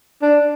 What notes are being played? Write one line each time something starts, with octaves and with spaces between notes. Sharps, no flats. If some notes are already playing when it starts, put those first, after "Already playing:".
D4